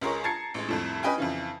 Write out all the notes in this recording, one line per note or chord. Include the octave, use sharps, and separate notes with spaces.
C#2 G#3 A#4 C#5
A5 A#5 G#6 A6 C7 C#7
A1 G#3
C2 F2 A2
C#4 B4 D#5 G5 G#5
F2 C#3 E3